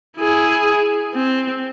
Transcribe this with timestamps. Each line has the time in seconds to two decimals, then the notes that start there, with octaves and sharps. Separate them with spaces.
0.18 E4 G#4
1.14 C4